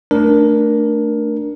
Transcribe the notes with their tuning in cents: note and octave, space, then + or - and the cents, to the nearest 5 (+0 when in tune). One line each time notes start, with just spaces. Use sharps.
A3 +10 D4 +0 A#4 +15